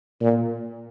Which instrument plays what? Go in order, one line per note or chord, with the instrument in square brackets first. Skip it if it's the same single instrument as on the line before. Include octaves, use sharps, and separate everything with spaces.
[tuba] A#2